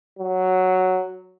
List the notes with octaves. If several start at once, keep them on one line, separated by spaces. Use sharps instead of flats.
F#3